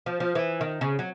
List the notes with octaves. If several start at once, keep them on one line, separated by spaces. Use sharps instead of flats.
F3
F3
E3
D#3
C#3
F#3